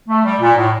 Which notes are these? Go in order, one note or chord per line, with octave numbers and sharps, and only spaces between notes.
A3
G3
A#2
A2